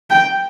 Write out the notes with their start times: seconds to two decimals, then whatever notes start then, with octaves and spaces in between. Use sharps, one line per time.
0.10 G5